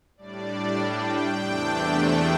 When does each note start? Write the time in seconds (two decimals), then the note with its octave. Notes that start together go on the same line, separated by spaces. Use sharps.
0.17 A2 G3 D4 D5
0.77 G5
1.37 E2 C3 A3 D4
1.97 G5